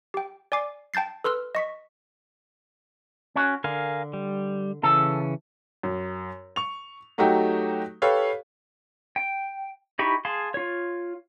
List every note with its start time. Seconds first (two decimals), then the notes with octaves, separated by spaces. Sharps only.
0.14 G4 G5
0.52 D5 G#5 D6 C7
0.94 G5 A5 G6 A6 C7
1.24 A4 B4 C6 E6 F6
1.55 D#5 C#6 B6
3.36 C#4 F#4
3.64 D3 A#4 F5 G#5
4.13 G3
4.83 C#3 E3 C#4 A4
5.83 F#2
6.56 C#6 F7
7.18 F#3 A3 D#4 F#4 G4
8.02 G4 A4 B4 C#5 F5
9.16 G5
9.99 D#4 E4 G4 B5 C#6
10.25 G#4 F5 A5 C6
10.54 F4 C#5